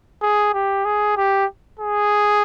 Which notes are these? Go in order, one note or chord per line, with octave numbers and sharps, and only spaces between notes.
G#4
G4
G#4
G4
G#4